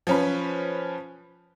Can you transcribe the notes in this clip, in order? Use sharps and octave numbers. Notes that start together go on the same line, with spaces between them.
F3 C#4 B4